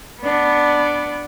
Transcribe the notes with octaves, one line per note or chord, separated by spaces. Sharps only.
B3 D4